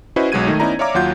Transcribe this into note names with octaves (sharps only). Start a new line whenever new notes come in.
C#4 E4 F#4 B4 C5 D#5
B1 F#3 G#3 F#4 G#6 D#7
D#3 A3 D#4
B3 C#4 D#4 E4 D5 A#5
C#5 D5 E5 F5 A#5 D6
D#2 F#3 F4 F#5 G6